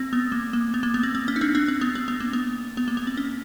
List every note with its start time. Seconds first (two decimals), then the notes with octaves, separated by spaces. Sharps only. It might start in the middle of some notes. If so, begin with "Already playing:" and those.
Already playing: C4
0.13 B3
0.32 A#3
0.53 A#3
0.74 B3
0.83 A#3
0.94 B3
1.03 C4
1.15 C4
1.28 C#4
1.36 D#4
1.41 C4 D4
1.55 C4 D4
1.68 C4
1.81 B3
1.95 C4
2.08 B3
2.20 A#3
2.33 B3
2.77 B3
2.88 A#3
2.97 B3
3.07 C4
3.17 C#4